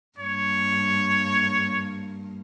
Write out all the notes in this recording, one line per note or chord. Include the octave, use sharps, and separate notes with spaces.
G2 A#3 C#5